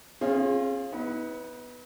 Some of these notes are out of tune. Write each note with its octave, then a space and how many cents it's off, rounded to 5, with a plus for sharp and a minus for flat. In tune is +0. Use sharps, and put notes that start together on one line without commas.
C#4 -45 F4 +0 G#4 +0
B3 +0 D#4 +45